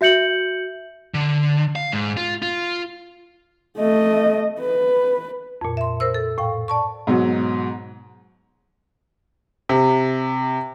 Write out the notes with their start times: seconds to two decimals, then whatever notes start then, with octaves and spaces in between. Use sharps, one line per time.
0.01 F#4 E5 G6 C#7 F#7
1.14 D3
1.76 F5
1.92 G#2
2.17 F4
2.42 F4
3.77 A3 D#5
4.60 B4
5.61 F2 A#2
5.77 E5 C6
6.00 A#4 C5 E6
6.14 A4
6.38 A2 F5 G5
6.68 D5 A5 C#6
7.07 G#2 B2 F#3
9.69 C3